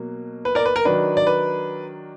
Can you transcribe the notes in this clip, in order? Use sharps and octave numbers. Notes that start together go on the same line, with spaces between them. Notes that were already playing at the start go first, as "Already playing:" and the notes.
Already playing: B2 F#3 A#3
B4
A#4 D5
B4
A#4
D#3 F#3 D4 B4
D5
B4